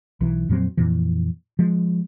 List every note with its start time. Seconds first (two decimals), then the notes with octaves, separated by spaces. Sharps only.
0.21 B1 E3
0.49 F2 A#2 F#3 C4
0.77 F2 A#2 E3
1.59 F3 G#3